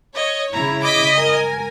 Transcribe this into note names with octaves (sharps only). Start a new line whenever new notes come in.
C#5 D#5
C#3 E4 A#5
D#5 D6 B6
A#4 G#5